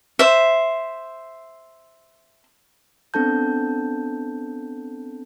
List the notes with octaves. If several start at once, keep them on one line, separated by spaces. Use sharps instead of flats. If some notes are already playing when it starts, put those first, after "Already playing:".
C5 E5
B3 C4 D4 A4 A5 G6